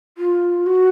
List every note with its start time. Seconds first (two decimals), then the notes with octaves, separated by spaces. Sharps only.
0.18 F4
0.66 F#4